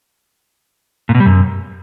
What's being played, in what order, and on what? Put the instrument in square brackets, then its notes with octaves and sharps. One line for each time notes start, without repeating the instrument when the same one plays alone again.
[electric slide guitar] A#2
B2
G3
F#2